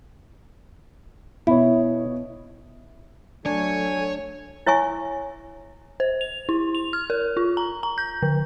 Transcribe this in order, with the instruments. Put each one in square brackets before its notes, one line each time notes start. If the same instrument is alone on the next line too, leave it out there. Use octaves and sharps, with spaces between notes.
[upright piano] B2 C#5 [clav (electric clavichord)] E4
[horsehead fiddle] F#3 A3 [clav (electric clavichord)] D4 [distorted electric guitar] C#5 [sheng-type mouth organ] G#5
[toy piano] E4 C#5 E5 G#5 C#6
[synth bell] C5
F7
E4
F7
F6
A#4
F4
A#5
A#5
G6
D3